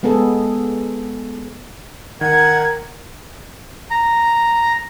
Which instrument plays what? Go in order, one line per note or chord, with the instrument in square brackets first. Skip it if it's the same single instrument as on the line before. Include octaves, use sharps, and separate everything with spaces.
[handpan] G#3 B3 G#4 A4
[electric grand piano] D#3 [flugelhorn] A#4 [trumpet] F#5 [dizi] G#6
[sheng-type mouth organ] A#5